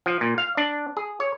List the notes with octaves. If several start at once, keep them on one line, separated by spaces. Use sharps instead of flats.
F3
A#2
F5
D4
G#4
C#5